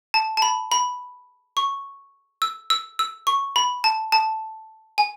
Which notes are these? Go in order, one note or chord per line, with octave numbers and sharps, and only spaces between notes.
A5
A5
B5
B5
C#6
E6
E6
E6
C#6
B5
A5
A5
G#5